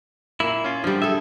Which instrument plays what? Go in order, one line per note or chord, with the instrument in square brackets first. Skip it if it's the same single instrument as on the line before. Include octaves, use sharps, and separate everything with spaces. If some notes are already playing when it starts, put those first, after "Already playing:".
[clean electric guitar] A#2 E4 [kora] A#3
[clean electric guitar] C#4 F4
[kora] D3 G3 [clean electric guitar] F3
[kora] G#4 A4 [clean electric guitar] E5